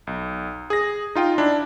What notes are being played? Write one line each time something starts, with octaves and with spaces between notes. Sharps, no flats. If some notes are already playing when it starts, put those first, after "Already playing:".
B1
G#4 A#6
D#4 F4 G5
D4 E4